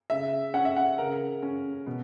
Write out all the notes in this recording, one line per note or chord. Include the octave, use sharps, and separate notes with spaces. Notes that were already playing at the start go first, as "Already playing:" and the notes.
C#3 E5
C#4 F#5
E5
F#5
C#3 A#4
C#4
B2